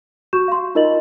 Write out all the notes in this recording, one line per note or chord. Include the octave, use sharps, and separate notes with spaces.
F#4 C#6 G6 E7
F5 C6
D#4 F4 A#4 D#5 A6 F#7